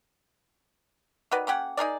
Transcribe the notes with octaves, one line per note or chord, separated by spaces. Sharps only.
D#3 F#4 B4 D5
A#3 C#4 G4 F#5
D#4 G#4 A#4 D5